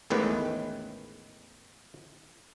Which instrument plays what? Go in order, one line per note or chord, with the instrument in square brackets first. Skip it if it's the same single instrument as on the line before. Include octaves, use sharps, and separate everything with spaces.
[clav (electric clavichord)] A1 E2 A2 D#3 G#3 B4